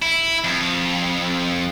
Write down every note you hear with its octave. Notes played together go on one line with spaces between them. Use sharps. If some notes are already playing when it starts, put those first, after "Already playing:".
E4
F2